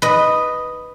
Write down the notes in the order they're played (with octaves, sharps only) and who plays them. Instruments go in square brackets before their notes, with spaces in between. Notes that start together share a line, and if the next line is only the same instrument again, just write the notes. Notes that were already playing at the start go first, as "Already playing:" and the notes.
[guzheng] B4 D#5